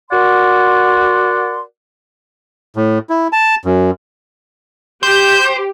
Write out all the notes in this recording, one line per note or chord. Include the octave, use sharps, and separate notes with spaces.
F#4 A#4 D5 F#5 C6
A2
E4
A5
F#2
G4 C5 G6